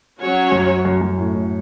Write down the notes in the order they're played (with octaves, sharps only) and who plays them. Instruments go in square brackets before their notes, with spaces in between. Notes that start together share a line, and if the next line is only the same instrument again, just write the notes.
[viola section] F#3 C#4 F#4 C#5
[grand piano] F#2
F#2
F#2
A2
A2